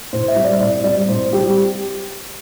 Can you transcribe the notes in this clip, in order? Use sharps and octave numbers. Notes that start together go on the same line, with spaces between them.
A2 C5
E5
G3 C4
D5
A2 D5
G3 C4 D5
A2 C5
G3 C4 G4